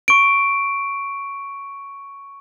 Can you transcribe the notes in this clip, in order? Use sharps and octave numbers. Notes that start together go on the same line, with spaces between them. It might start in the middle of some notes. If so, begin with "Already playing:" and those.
C#6 D7